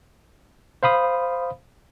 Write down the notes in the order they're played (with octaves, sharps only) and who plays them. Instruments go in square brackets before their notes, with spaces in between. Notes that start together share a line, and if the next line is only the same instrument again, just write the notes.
[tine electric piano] C5 F5 B5 D#6